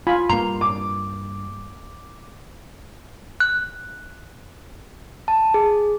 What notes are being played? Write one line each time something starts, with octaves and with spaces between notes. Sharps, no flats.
F4 G#5 B5
G2 A#3 A#5 C6
D6
F#6
A5
G#4